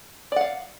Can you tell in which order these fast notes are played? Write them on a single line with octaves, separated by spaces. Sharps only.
D5 F#5 F5